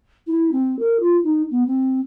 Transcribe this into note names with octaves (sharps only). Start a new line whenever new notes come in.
E4
C4
A#4
F4
D#4
B3
C4